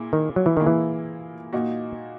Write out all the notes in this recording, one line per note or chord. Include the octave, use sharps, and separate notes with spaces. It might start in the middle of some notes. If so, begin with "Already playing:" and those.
Already playing: A#2 A#3 E4 G#4
D#3
F#3
E3
A#2 D#3 A#3 E4 G#4
E3
A#2 A#3 D#4 F#4